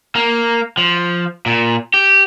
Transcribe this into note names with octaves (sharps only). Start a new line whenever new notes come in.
A#3
F3
A#2
G4